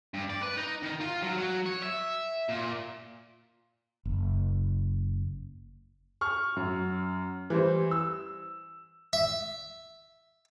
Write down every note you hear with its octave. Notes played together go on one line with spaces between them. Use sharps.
G2
D5
B4
D#4
D#3
F4
F#3
F#3
C#5
E5
A#2
F#1
C#6 F6
F#2
E3 G3 C5
E6
E5